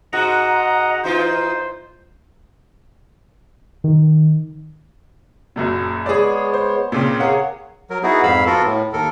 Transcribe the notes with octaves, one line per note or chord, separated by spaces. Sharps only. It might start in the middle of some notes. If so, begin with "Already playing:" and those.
G#2 F#4 D#5 F#5 A#5
E3 D#4 F4 C5
D#3
F#1 F#2 A#2
G#3 B3 G#4 C#5 D5
C5
A#2 C#3 C4
G#4 A#4 C#5 F5 F#5
F#3 A#4
B3 D#4 E4 F#4 G#4
F2 G#2 F5 B5 E6
B3 F4 F#4 A4 A#4
A2
D#2 A4 A#4